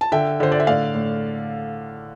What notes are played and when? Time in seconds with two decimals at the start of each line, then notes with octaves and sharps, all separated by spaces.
0.01 A5
0.12 D3 E5 G5
0.40 D3 C5
0.52 D5
0.60 E5
0.67 A2 D5 F5
0.95 A2